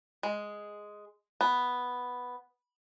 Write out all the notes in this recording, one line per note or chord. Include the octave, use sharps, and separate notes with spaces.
G#3
B3